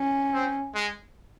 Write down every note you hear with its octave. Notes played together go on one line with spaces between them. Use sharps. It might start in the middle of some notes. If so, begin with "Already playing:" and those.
Already playing: C#4
C4
G#3